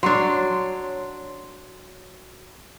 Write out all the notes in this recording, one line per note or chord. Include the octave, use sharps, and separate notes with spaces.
F#3 D4 C#5 C6